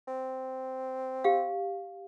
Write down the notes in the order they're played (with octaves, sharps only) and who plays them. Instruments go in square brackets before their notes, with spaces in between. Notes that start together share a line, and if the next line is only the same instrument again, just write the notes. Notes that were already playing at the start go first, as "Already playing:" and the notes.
[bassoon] C4
[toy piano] G4 F5